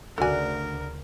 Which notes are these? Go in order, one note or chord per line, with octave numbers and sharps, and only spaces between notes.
D2 C#3 D4 F#4 A4 A#4 D5 G#5